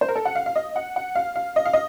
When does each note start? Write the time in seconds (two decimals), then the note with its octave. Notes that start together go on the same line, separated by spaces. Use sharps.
0.01 C5
0.08 A#4
0.15 A4
0.25 F#5
0.35 F5
0.46 F5
0.56 D#5
0.76 F#5
0.96 F#5
1.15 F5
1.36 F5
1.56 D#5
1.65 F5
1.73 D#5